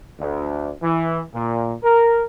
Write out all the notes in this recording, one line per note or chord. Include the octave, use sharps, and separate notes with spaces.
D2
E3
A#2
A#4